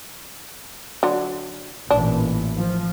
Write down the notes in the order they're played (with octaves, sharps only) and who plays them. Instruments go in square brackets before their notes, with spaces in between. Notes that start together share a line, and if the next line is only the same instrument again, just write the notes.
[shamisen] D3 F#3
[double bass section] A1 A#2 E3 [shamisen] D4
[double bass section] F3